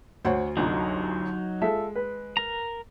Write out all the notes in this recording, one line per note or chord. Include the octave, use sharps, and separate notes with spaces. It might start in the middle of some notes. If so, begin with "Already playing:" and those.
D2 C5 C#5 F#5
G1 C2 D3 F#3 D#4
G#3 F4 A4 E5
B4
A#4 A#5